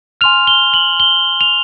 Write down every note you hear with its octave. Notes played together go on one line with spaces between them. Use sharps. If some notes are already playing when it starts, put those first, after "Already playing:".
G#5 C6 F6 F7
G7
F#7
G7
F7